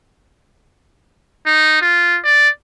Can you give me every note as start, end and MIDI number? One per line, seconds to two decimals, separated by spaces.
1.46 1.77 63
1.81 2.18 65
2.24 2.49 74